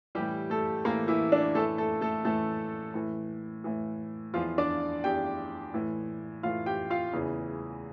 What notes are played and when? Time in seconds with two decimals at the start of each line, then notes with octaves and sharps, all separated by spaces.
0.15 A2 E3 G3 G4
0.50 A3 A4
0.85 A2 E3 A#3 A#4
1.08 E3 E4
1.32 D4
1.55 A2 E3 A3 A4
1.78 A3 A4
2.01 A3 A4
2.24 A2 E3 A3 A4
2.94 A2 E3
3.64 A2 E3
4.34 E2 E3 F3 F4
4.58 D4 D5
5.04 E2 E3 G4 G5
5.74 A2 E3
6.43 A2 E3 F4 F5
6.66 G4 G5
6.90 F4 F5
7.13 E2 C#3 E3